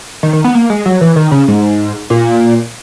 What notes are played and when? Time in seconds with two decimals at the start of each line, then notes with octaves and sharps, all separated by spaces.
0.23 D#3
0.33 D#3
0.44 B3
0.55 A#3
0.70 G#3
0.86 F#3
1.01 E3
1.16 D#3
1.31 C#3
1.48 G#2
2.10 A#2